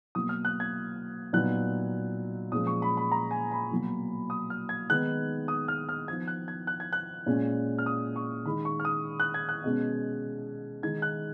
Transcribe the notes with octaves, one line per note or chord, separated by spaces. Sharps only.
B2 F#3 A#3 D#6
F6
F#6
G#6
A#2 F#3 B3 D#4 F#6
A#2 F3 G#3 C#4 D#6
C#6
B5
B5
A#5
G#5
B5
B2 F#3 A#3
D#6
F6
G#6
D#3 G#3 B3 D#4 F#6
D#6
F6
F6
F3 B3 D#4 G#6
F#6
G#6
F#6
G#6
F#6
A#2 G#3 C#4
F6
D#6
C#6
D#3 G#3 D#4 B5
C#6
F6
D#6
F#6
G#6
F#6
B2 G#3 C#4
D#3 G#3 D#4 G#6
F#6